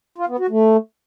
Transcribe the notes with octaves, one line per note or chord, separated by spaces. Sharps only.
F4
B3
F#4
A3